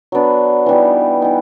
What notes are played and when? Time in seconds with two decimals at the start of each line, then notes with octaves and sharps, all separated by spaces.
0.12 F#3 B3 D4
0.66 E3 G3 B3 D#4
1.22 E3 G3 B3 D#4